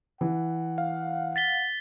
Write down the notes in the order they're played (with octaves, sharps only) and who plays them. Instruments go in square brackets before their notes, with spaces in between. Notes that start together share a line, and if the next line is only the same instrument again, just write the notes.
[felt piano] E3 [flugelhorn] F#5
[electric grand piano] F5
[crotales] A6 B6 G7